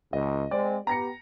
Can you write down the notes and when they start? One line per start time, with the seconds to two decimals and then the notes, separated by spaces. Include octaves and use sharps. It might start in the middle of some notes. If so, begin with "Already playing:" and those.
0.13 C#2 D#5
0.51 G#3 C4 D5
0.87 B3 G4 A#5 A#6 C#7